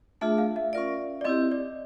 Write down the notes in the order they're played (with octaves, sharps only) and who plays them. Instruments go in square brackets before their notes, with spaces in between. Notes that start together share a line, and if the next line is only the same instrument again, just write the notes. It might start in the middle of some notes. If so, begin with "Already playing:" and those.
[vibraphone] A3 D4 F4 G#4 [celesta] E5
[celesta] F5
E5
[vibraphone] C#4 F4 A#4 D5
[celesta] D5
[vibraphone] C4 E4 G4 [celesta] D#5
[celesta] D5